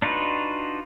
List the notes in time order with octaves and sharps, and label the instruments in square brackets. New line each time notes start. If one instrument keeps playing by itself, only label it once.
[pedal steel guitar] D4 D#4 F4 F#4 B4